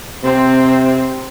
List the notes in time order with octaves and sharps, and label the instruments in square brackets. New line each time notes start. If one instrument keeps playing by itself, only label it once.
[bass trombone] C3 [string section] C4